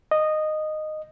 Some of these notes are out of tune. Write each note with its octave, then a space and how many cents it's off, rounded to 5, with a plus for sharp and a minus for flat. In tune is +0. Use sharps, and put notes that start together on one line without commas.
D#5 -10